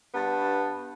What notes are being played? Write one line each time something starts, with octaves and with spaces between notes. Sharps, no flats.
G2 B3 A5